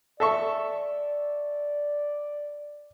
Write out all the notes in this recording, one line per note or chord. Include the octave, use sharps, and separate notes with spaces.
A4 D5 E5 C#6